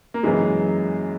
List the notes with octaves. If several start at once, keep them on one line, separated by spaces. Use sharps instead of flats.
A#3
F#2 C#3 E3 G#3